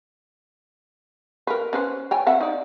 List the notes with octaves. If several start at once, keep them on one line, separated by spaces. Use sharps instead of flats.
A#4 B4
C#4 B4 C5
C#5 G5 G#5
C4 E5 F#5
D#4 D5